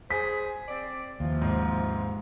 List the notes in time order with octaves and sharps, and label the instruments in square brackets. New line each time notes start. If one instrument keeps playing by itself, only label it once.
[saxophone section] G#4 C5 [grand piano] B6
[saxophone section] C4 D5
[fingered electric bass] D#2 [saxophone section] C3 E3 F3
[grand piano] G#2